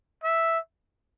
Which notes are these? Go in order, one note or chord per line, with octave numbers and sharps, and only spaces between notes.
E5